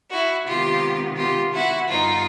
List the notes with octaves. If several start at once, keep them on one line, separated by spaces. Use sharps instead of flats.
E4 F#4
C3 D#3 G#3 B3 F4 G4
F4 G4
E4 F#4
G2 D3 G3 B3 D#4 F4